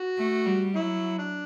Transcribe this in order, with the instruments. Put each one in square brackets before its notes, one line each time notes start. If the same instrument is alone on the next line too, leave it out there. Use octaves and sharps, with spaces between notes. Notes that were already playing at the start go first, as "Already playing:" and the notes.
Already playing: [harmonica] F#4
[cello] A3
G3
[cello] F#3 [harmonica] E4
[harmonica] D4